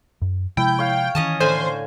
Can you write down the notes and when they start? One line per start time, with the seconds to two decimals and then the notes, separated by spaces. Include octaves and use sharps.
0.22 F#2
0.57 C3 F3 G#3 E4 G5
0.79 C#5 F5
1.15 D#3 E3 C#4 D#5 A5
1.40 A2 D3 C5 G#5